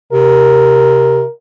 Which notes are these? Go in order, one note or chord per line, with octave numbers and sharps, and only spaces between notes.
C3 A#4